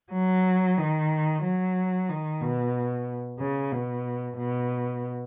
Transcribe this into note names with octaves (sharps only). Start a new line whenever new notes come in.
F#3
D#3
F#3
D#3
B2
C#3
B2
B2